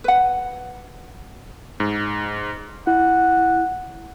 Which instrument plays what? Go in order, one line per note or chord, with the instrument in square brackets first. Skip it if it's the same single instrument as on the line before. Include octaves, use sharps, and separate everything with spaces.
[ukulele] B4 F#5
[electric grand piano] G#2
[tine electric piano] E4 [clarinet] F#5